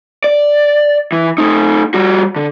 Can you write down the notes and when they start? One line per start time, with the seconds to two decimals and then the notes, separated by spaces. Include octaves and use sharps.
0.24 D5
1.12 E3
1.38 A3 D#4
1.94 G3 F#4
2.36 D3